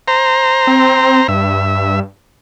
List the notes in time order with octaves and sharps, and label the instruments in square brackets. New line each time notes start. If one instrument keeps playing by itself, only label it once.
[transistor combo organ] C5 A#5
[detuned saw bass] C4
[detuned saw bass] G2 [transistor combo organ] E5